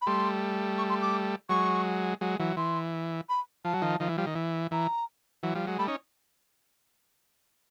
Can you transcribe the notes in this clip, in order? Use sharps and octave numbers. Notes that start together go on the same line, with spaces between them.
B5
G3 A3 C6
C#6
C6
D6
F#3 G#3 C#6
F#3 G#3
E3 F#3
E3 C6
B5
F3 A5
F#3
D#3 F3
D#3 F3
E3
F3 G3
D#3
E3
E3 A#5
E3 F#3
F3 G3
F#3 G#3
G3 A3 B5
C#4 D#4